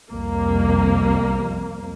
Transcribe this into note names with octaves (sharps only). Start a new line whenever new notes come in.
C2 F2 A#3